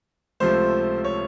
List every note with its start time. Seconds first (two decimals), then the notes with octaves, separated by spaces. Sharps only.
0.40 C#2 C3 F3 A3 C5
1.05 C#5